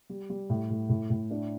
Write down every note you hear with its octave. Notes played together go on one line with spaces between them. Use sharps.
G3
G3
A2
A2
A2
A2
D4